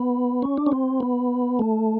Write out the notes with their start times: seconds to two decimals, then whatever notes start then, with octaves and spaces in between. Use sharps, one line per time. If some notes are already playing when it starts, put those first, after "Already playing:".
Already playing: B3
0.42 C#4
0.57 D4
0.66 C#4
0.72 C4
1.00 B3
1.59 A3